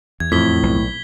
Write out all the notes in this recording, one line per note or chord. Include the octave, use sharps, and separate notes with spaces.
E2 G#6
F2 A2 B6 G7
B1